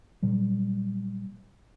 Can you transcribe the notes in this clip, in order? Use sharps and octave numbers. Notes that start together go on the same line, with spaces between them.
A#2 F#3 G3